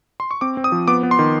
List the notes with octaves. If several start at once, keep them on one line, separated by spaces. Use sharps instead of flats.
C6
C#6
C4 D6
C4
D#6
F3
B3 D6
B3
C6
D#3